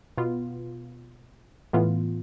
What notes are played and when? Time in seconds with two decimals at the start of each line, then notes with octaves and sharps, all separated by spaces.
0.17 B2 B3 F4
1.73 A2 E3 B3 F4